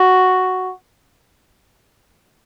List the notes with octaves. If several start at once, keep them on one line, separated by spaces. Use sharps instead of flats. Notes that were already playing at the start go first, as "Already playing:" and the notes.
Already playing: F#4